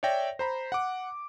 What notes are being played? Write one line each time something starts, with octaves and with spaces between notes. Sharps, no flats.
C#5 D5 E5 G5 A#6
C5 A#5 B5
F#5 D6